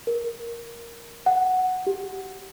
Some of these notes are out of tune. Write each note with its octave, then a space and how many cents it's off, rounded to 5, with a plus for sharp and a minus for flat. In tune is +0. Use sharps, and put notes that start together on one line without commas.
A#4 +5
F#5 +0
G4 -15